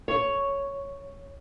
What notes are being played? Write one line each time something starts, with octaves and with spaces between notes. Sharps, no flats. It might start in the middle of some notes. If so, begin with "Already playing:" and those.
C#5